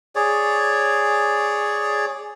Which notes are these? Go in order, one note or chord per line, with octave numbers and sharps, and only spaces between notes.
G#4 C#5 D5